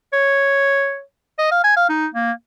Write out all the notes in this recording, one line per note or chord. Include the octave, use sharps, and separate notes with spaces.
C#5
D#5
F5
G#5
F5
D#4
A#3